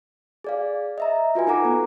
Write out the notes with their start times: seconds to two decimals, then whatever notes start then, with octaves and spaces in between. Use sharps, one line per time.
0.44 G#4 D5 F5
0.98 D#5 E5 A#5
1.35 F4 F#4 B4 G#5
1.47 D#4 A4 F#5 A#5 D6
1.65 B3